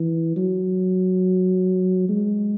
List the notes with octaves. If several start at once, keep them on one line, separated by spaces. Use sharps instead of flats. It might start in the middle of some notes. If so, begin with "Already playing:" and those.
Already playing: E3
F#3
G#3